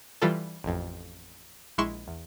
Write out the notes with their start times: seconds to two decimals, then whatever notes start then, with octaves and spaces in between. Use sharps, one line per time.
0.22 E3 G3 F4 A4
0.64 A1 F2
1.78 A#1 G#3 E4 C6 C#6 E7
2.08 E2